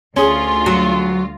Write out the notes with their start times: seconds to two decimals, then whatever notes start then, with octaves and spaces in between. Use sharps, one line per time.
0.16 D2 C#4 F4 G#4 C6
0.66 F#3